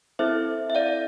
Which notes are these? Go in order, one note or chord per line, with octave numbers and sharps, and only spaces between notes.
C4 E4 A4 C5 E5
E5
D5 F5